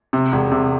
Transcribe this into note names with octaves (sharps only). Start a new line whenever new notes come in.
C3
E1
C3